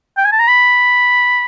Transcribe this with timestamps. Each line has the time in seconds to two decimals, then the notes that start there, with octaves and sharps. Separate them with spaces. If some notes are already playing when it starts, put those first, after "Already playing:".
0.17 G5
0.25 G#5
0.32 A5
0.39 A#5
0.48 B5